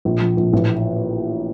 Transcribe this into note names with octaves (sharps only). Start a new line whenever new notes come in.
A#1
F3
A#1
A1